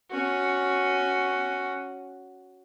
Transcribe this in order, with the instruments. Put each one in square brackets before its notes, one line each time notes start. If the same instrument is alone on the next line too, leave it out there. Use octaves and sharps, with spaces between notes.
[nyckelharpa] C#4 F#4